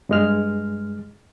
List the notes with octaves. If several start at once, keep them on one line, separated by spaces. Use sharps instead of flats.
G2 G#3 F6